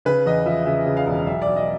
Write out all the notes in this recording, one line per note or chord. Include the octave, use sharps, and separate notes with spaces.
C#3 B4
E2 D#5
F3 E5
C#3 E5
C#3
F5
E1
B1 E5
D5
B1
D#5